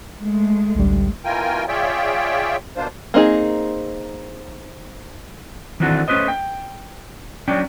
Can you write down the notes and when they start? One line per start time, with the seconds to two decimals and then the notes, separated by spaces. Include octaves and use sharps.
0.18 G#3 A3
0.75 A1 D2 G3
1.25 B2 E3 F4 A#4 G5 G#5
1.68 F4 G#4 C#5 D5 E5 G5
2.76 B2 A#3 D4 F4 C5
3.14 A#3 C4 D#4 G#4
5.80 D#3 E3 C4 D4 F#4 A4
6.08 A3 C#4 F4 B4 C5 D#5
6.28 G5
7.48 F#3 C#4 D4 D5 G5